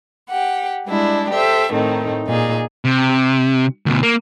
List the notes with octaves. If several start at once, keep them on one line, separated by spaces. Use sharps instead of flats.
G4 F#5
G3 G#3 D4 E4
G4 A4 C5 E5
A2 D#3 A3 C4 D#4
A#2 D#4 G#4
C3
D2 B2
A#3